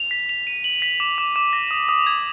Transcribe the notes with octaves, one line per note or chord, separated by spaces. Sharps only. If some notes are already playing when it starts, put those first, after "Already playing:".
Already playing: F7
B6
F7
D#7
F#7
B6
D6
D6
D6
A#6
D#6
D#6
G#6